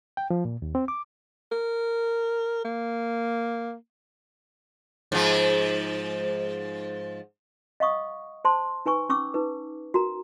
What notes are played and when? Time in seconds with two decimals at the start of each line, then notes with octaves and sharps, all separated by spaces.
0.17 G5
0.30 F3
0.45 A#2
0.62 D#2
0.75 C4
0.88 D6
1.52 A#4
2.65 A#3
5.12 G#2 F3
7.80 D#5 F5 F#5 C#6 D#6
8.45 C5 A5 C6
8.86 D#4 B4 G#5 C#6
9.09 C#4 C#6 D6 E6
9.34 D#4 B4
9.94 F#4 A#4 A#5